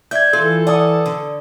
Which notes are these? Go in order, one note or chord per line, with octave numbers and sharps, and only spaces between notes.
D5 E5 G6 G#6
E3 F4 A4
D5 F#5 A5 D#6
D3